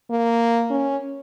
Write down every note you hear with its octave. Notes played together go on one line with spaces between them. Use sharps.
A#3
C#4